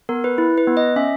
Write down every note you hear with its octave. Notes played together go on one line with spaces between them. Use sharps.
B3 A#4
B4
E4
B4
B3
D#5
C#4 E5